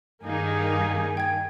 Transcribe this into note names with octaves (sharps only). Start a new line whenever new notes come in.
G2 D#3 A#3 D#4 G#4 G#5
G5 G#6